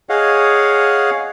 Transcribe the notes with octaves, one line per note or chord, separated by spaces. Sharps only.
G#4 C#5 D#5 F5 F#5